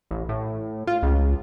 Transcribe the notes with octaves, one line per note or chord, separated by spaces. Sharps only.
A1
A2
F4
C#2